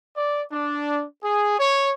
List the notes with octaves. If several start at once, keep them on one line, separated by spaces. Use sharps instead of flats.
D5
D4
G#4
C#5